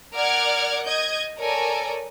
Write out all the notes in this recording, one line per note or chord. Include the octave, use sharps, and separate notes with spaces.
A#4 D5 F#5 D6 F6 G#6
D#5 G6 G#6
A4 A#4 C#5 D5 G#5 A#5